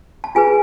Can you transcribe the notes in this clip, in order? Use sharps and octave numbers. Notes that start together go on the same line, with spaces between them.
A5
F4 G#4 B4 G#5